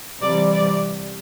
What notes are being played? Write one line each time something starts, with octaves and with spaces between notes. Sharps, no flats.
C3 E3 G3 D5
D5